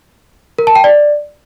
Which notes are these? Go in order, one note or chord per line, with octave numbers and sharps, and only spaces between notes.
A#4
A5
G5
D5